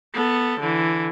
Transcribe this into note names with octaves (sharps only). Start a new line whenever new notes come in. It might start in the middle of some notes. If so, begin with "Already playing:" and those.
B3 A4
D3 E3